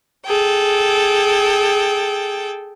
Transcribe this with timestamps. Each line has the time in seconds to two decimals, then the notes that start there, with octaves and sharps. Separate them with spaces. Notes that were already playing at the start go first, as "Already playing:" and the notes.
0.26 G#4 A4 G5